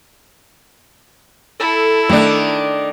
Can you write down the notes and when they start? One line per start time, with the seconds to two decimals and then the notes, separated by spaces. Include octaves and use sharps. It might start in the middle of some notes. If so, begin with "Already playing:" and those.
1.60 E4 A4
2.09 D#3 A3 D4